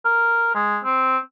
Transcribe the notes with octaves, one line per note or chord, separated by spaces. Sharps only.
A#4
G#3
C4